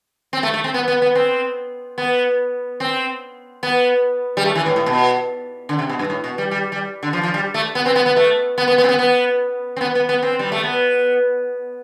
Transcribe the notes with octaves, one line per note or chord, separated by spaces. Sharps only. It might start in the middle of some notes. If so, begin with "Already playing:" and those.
C4
A3
A3
C4
B3
B3
B3
C4
B3
C4
B3
G3
A3
E3
A2
A2
B2
D3
C3
B2
G2
A2
B2
G3
G3
G3
D3
F3
F3
G3
A3
B3
C4
B3
B3
A3
B3
B3
B3
C4
B3
B3
C4
B3
B3
B3
C4
G3
A3
B3